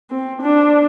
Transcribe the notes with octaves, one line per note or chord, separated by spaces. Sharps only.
C4
D4